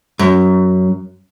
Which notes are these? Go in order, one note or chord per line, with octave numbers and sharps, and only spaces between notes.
F#2